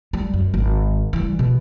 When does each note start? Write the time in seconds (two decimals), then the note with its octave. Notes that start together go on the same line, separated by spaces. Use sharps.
0.13 G3
0.34 F#2
0.54 G#1
1.13 E3 G3
1.39 B2